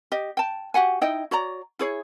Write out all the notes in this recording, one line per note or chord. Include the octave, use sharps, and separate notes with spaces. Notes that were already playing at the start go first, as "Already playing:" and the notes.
G4 D#5
G5 A5
F#4 G4 F#5 G#5
D#4 E4 D#5 G5
F#4 C#5 D5 A#5
E4 G#4 C#5